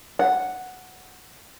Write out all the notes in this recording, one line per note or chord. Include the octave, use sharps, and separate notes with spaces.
F#5